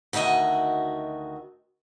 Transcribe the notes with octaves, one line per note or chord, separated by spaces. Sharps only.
D2 D#3 F#4 D#5 E5